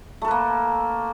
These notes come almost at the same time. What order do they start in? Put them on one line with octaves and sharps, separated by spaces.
A3 A4 B4 A#3